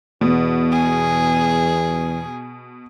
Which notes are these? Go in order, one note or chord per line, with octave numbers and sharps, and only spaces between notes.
E2 B2
G#4